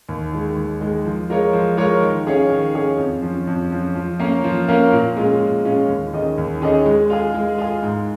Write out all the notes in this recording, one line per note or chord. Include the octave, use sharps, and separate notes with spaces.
D#2
D#3 G#3
D#2
D#3 G#3
F3
G#3 F4 A#4 C#5
F3
G#3 F4 A#4 C#5
D#3
C#4 G#4 C#5 F5
D#3
C#4 G#4 C#5 F5
F2
F3 C#4
F2
F3 C#4
F3
A#3 C#4 A#4 F5
F3
A#3 C#4 A#4 F5
A#2
G#3 C#4 F4
A#2
G#3 C#4 F4
D#2
D#3 C#4 G#4 D#5
D#2
D#3 C#4 G#4 D#5
G#3
F4 G#4
G#3
F4 G#4
G#2